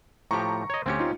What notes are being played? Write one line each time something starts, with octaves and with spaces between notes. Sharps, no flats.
A2 F3 G4 A#5 C#6
C#5 D#5
D2 C4 C#4 G4 C#7
D#4 F4